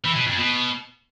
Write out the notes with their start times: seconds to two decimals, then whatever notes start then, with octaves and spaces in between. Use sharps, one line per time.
0.05 E3
0.16 B2
0.27 F2
0.38 B2